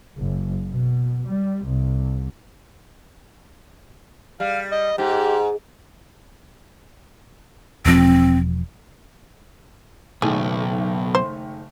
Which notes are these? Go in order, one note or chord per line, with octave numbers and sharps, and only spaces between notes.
F#1
B2
G3
C2
G3 F5
D#5
G#2 G4
E1 F3 C4
F#1 B1 D#3 A3 G#4
C5